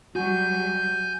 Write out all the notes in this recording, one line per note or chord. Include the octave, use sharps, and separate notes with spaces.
F#3 G3 F#4 G#5 G6